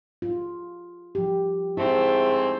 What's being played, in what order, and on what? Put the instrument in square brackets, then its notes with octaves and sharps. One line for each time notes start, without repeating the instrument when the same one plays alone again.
[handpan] F4
F3 G4
[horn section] G#2 A3 C4 [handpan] E4 G#4